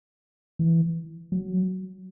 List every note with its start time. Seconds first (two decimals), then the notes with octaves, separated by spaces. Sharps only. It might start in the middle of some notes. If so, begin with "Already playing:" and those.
0.59 E3
1.32 F#3